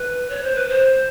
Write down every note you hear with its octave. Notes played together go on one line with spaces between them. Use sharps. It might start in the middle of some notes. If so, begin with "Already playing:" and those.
Already playing: B4
C#5
C5
B4
C5